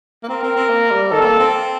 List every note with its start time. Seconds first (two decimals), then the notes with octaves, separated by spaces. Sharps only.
0.23 A#3
0.28 C4 A#4
0.43 C4
0.56 C4
0.69 A#3
0.91 G3
1.11 D#3 A4
1.20 C4
1.26 A#3
1.39 C4